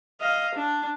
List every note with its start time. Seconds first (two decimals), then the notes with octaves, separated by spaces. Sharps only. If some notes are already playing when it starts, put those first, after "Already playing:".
0.21 D#5 F5
0.55 D4